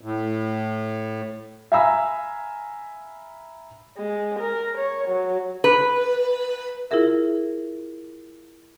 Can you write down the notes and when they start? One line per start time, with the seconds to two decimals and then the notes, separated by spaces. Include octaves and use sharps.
0.01 A2
1.72 E5 F5 G#5 A#5 B5 E6
3.98 G#3
4.40 A#4
4.77 C#5
5.08 F#3
5.64 B4
6.91 E4 F4 G#4 A#4 E5